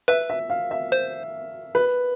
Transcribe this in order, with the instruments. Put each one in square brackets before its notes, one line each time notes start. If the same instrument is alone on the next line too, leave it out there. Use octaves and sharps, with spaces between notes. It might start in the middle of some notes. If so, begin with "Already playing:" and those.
[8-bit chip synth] B4 [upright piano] E5
[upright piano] E5
F5
E5
[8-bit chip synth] C5
[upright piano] B4